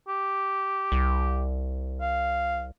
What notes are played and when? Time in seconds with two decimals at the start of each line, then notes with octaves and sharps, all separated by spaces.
0.08 G4
0.92 C2
2.01 F5